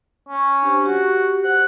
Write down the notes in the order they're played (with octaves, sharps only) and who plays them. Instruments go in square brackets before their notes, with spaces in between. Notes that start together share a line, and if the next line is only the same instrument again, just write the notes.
[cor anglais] C#4
[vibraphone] D4 G4 C5
[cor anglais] F#4 [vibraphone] G4
[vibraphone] C5 [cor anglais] F#5